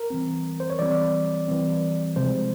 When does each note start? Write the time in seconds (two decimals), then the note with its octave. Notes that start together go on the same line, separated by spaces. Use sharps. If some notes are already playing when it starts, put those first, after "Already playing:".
Already playing: A#4
0.10 E3 G3 C4
0.60 C5
0.70 C#5
0.79 E3 G3 C4 D5
1.48 E3 G3 C4
2.16 C3 F3 G#3 C4 C5